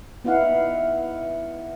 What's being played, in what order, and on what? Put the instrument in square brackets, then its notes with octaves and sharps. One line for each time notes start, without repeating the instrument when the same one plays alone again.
[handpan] B3 D#4 E4 F5 F#5